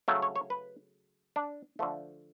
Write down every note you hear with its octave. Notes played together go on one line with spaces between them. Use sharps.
C#3 F#3 A3
C#5
C#5
B4
D4
D3 F3 A3